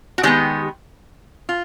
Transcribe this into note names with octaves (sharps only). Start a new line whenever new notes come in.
F#4
D#3 G#3 B3 G4
F4